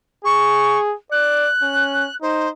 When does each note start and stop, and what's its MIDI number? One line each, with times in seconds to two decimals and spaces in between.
0.25 0.94 68
0.25 0.78 85
1.11 1.49 74
1.11 2.15 90
1.62 2.07 61
2.22 2.51 63
2.22 2.48 72